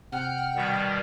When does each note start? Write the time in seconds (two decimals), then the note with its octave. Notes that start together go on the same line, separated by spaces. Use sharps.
0.12 C3 F#5 G5 F6
0.56 B2 D#3 G3